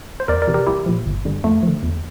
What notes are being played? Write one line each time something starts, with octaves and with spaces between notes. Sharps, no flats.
C5
E2 A#4 D5
A#4 D5
C3 E3
G4 A#4
C2 E4 G4
A#2 F3
G1
G2 D3 G3
F2 A3
D3 F3
E2